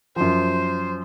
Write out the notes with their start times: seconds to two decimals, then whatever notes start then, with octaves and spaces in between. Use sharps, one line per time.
0.16 F#2 F3 C5